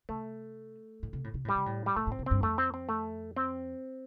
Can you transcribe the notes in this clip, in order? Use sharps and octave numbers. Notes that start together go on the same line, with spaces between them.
C3 A3
A2
C3
A2
C3
A2 G3
C3
A2
G3
A2 A3
A2
C4
C3
G2 C4
F2 A3
C4
C4
A3
C4